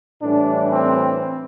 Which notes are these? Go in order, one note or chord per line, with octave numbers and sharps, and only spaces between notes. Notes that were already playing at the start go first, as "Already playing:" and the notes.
A2 E3 G3 D4
C4